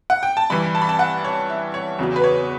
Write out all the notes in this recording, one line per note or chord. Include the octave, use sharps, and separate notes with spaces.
F#5
G5
A5
G2 E3 B5
A5
B5
A5
F#5
C#5
E5
C#5
E2 C#3 F#3
B4
C#5